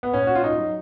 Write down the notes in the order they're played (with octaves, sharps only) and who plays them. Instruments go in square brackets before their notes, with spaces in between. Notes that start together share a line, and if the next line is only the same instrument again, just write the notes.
[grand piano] B3
A#2 C#4
F#4
F4
D#4
F#3